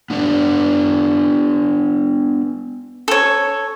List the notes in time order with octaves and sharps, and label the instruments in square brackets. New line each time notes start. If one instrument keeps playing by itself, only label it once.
[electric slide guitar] B3 D4 B4 D5
[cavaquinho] A4 C#5